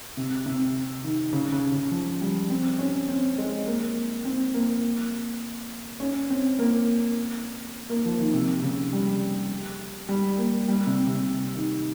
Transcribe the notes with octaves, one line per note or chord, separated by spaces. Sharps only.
C3
C3
D#3
C#3
C#3
C#3
F3
G3
C4
C#4
C4
G#3
A#3
C4
A#3
C#4
C4
A#3
A#3
F3
D#3
C3
C#3
G3
G3
A#3
G3
C3
C3
D#3